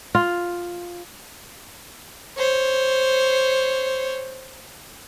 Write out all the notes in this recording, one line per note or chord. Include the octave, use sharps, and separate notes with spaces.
F4
C5 C#5